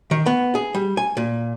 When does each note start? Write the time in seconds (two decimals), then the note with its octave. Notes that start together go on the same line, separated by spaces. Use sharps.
0.11 D#3
0.26 B3
0.55 G#4
0.75 G3
0.97 G#5
1.17 A#2